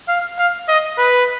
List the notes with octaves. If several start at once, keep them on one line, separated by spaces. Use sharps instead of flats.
F5
F5
D#5
B4